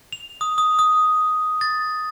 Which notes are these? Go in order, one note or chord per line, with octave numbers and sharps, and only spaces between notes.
F7
D#6
D#6
D#6
A6